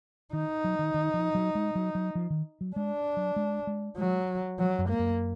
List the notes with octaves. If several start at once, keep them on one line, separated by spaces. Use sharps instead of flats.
D#3 D#4
F#3
D#3
D#3
F3
F#3
G#3
F#3
F#3
F3
D#3
F#3
G#3 D4
F#3
G#3
G#3
F#3 G#3
F3 F#3
F#2
A#3
F#2